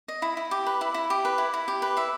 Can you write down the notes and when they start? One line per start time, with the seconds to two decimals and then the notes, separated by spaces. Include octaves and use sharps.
0.08 D#5
0.22 E4
0.37 E4
0.51 G4
0.66 B4
0.81 E4
0.94 E4
1.10 G4
1.25 B4
1.38 E4
1.53 E4
1.68 G4
1.82 B4
1.97 E4 E5